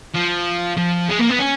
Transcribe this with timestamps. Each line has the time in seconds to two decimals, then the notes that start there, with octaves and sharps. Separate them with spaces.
0.16 F3
0.77 F3
1.09 G#3
1.19 A#3
1.29 B3
1.39 C#4